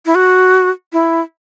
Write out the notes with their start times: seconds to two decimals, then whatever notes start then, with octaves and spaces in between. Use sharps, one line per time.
0.06 E4
0.15 F#4
0.93 E4